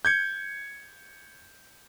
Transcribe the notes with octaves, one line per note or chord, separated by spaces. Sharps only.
G6 G#6 C#7